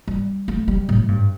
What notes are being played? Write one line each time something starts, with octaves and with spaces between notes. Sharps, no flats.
G3
A3
G3
A2
G2